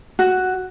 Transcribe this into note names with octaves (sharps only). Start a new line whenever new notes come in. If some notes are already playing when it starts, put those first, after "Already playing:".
F#4